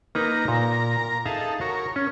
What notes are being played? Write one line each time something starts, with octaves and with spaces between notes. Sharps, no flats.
A#3 D#4 A#4 B4 A#5
A#2
D#4 G#4 A4 E5 F5
F#4 A#4 C#5
C#4 C#5